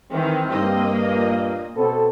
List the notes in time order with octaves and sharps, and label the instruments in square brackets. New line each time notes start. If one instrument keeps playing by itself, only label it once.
[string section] D#3 E3 [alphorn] C4
[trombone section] G2 [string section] A#3 D#5
[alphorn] A#2
[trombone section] B2 C4 A4 [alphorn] B3